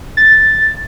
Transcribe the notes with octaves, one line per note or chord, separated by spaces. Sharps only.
A6